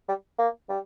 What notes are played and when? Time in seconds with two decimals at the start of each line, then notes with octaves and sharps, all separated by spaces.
0.08 G3
0.38 A#3
0.69 G3